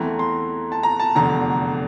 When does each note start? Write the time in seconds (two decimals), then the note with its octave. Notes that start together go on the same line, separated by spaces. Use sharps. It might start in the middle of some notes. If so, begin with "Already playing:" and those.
Already playing: E2 E3 A3 C4 A#5
0.19 C6
0.72 A5
0.83 A#5
1.00 A5
1.15 F1 E2 D3 A#5